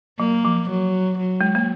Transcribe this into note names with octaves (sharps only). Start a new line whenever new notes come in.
F#3 A#3
F3
F#3
F#3
G#3
A#3